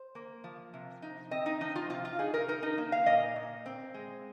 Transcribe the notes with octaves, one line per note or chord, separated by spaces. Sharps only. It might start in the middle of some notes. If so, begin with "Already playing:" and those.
Already playing: C5
A#3
F3
C3
D#4
C4 D#5
D#4
F3 D#4
F4
C3 F4
F4
D#4 G#4
A#4
D#4 A#4
D#4
A#3
F5
A#2 D#5
A#2
C4
G#3